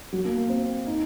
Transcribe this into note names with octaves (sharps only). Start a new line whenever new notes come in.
F#3
A#3
A#3
C4
D#4